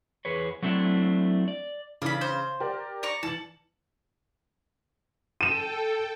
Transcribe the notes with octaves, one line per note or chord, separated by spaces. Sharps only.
E2 G#4 B4 C#5
F#3 A3 C4 D4 E4
D5
C#3 E3 D4 B5
C5
G4 A#4 D5
D5 A#5 C#6
E3 A5 C#7 F#7
A4 G5 D#7 E7